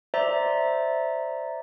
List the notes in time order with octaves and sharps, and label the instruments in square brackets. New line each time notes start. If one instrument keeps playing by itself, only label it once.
[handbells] C5 D5 E5 A#5